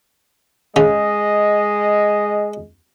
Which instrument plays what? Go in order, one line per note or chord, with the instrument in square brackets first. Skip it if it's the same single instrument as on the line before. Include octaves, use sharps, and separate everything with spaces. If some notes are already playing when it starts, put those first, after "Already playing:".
[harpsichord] C#3 [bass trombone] G#3 [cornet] D#5